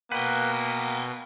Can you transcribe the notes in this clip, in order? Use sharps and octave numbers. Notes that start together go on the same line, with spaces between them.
B2 A#3 B4 F#5 G5